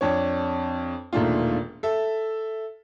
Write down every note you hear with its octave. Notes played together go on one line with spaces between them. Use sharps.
F2 D4 C#5
E1 A#2 D#3 A3 D4 F4
A4 E5